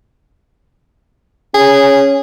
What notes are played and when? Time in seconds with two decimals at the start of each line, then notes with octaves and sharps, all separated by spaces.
1.55 C#4 G#4